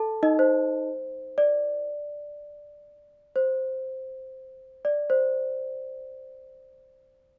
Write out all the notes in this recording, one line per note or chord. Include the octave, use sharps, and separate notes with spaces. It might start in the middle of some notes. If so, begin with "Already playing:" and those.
Already playing: A4 A5
D#4 D#5
C5
D5
C5
D5
C5